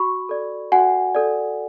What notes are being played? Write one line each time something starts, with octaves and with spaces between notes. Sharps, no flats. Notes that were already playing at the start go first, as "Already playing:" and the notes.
Already playing: F#4 B5 C#6
A4 D5
F#4 F#5 G#5
A4 D5